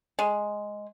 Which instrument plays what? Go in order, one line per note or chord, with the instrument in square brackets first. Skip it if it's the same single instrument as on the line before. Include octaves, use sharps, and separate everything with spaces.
[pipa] G#3